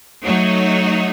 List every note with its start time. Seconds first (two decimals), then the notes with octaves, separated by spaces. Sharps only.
0.23 F#3 A3 D#4 F#4 C#5